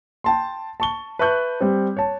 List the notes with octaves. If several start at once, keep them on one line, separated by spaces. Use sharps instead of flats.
G5 A5 C6
A5 C#6 G7
B4 E5 A5 C#6 F#6 G6
G3 C4
C#5 A5